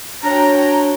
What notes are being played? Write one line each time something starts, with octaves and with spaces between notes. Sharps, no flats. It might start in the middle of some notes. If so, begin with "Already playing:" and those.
D4 F#4 C#5 G5 A#5